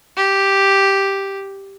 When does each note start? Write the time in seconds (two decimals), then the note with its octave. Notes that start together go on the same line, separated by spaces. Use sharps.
0.17 G4